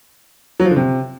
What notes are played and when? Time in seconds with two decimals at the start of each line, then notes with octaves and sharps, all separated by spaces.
0.60 F#3
0.65 F3
0.71 D3
0.76 C3